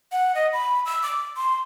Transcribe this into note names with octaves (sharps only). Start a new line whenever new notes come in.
F#5
D#5
B5
E6
D6
C6